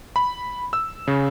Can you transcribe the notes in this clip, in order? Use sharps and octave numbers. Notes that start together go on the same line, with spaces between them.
B5
E6
C#3